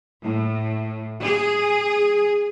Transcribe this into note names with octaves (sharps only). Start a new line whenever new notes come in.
A2
G#4